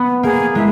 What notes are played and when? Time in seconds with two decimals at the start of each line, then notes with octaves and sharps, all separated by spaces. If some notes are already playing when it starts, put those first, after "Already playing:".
Already playing: B3
0.23 A#3 G#4
0.55 G#3 E4